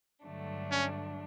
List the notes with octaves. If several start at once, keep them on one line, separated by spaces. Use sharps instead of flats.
G2 D3 F#3 A3 D4
C#4